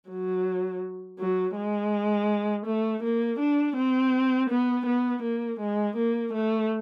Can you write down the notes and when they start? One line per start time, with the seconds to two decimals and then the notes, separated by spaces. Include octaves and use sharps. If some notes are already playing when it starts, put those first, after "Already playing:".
0.09 F#3
1.19 F#3
1.56 G#3
2.66 A3
3.03 A#3
3.40 D4
3.77 C4
4.50 B3
4.87 B3
5.23 A#3
5.60 G#3
5.97 A#3
6.34 A3